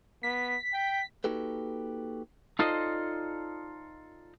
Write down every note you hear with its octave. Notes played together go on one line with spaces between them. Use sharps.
B3 B6
G5
A#3 D#4 F#4 G4 A4 B4
D#4 F4 A4 C5 D5 D#5